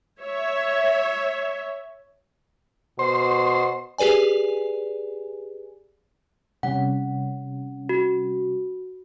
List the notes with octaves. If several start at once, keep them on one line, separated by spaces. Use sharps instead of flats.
C#5 E5
B2 C5
G4 G#4 B4 D5 G#5
C3 G3 C#4 F#5
F#4